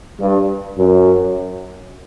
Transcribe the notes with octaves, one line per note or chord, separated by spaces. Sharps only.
G2
F#2